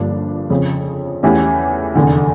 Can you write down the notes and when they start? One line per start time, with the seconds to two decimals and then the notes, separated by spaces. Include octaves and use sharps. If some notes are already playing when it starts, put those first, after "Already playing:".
Already playing: G1 G2 F3 A#3 D4
0.50 F2 C#3 F3
1.23 E2 E3 A3 C#4 G4
1.95 F1 E2 D3